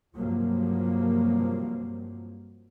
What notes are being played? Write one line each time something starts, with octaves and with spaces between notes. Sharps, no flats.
G2 C3 F3 F#3 A#3